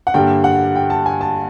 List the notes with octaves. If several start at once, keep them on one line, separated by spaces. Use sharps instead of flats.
F#5
G2 D3 G3 A#3 G5
F#5
G5
A5
G#5
A5